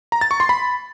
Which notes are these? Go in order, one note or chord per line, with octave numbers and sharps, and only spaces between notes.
A#5
A6
C#6
C6
B5